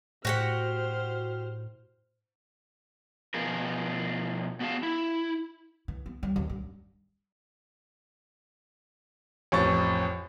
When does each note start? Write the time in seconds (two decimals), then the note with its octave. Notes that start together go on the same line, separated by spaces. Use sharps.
0.25 A2 F#4 G4 C5 F#5 F6
3.34 B2 F3 G#4 A#4
4.60 B3 F#4 G#4 F5 A5
4.83 E4
5.88 E3
6.06 B3
6.23 G3
6.36 D#1
6.50 G2
9.52 A1 F2 C#6 A6